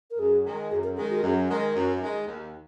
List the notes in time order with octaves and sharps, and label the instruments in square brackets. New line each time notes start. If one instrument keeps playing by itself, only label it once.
[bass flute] A#4
[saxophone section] F#2 [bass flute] G#4
[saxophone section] D#3 G#3
[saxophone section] F#2 [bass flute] G#4
[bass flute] A#4
[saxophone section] D#3 G#3 [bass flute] G#4
[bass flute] F#4
A#4
[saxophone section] F#2 [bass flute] G#4
[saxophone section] D#3 G#3 [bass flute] A#4
[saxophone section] F#2
D#3 G#3
D#2